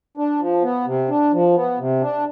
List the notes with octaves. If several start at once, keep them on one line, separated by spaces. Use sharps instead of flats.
D4
F3
B3
C3
D4
F3
B3
C3
D4